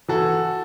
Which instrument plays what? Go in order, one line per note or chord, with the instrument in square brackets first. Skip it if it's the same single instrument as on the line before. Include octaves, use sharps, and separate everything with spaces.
[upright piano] E3 F#4 A4